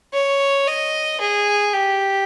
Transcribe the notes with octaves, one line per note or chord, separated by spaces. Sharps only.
C#5
D#5
G#4
G4